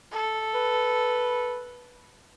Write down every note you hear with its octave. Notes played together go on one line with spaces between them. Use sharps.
A4
B4